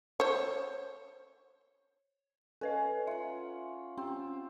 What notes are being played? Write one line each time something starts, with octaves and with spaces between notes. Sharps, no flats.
C5 C#5
C#4 A4 B4 D#5
F4 E5 F#5
C4 C#4 F4